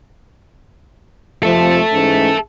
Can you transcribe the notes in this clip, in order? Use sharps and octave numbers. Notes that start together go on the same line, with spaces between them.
F2 C3 F3 A4 E5
G#2 E3 C#4